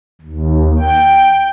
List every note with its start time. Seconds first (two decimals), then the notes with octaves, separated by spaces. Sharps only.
0.21 D#2
0.79 G5